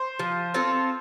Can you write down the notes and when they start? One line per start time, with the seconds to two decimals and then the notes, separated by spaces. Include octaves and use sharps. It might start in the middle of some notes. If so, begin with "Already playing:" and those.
Already playing: C5
0.19 F3
0.54 C4 F4 A4